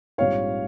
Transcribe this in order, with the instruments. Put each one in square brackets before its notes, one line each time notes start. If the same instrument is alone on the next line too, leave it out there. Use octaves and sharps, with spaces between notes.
[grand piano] A#1 G#2 G3 C4 F4 [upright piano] C#5 F5